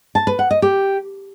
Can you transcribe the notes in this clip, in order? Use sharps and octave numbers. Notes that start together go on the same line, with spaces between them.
A5
B4
F#5
D#5
G4